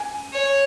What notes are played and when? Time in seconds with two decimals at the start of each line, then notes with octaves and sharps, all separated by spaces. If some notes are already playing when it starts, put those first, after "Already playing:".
Already playing: G#5
0.33 C#5